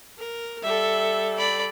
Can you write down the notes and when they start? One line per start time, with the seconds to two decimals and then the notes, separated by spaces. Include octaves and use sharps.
0.18 A#4
0.63 G3 A4 E5
1.38 D5 B5